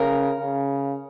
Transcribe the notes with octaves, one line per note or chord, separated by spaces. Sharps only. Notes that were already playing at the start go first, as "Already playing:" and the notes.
Already playing: C#3 A#4
C#3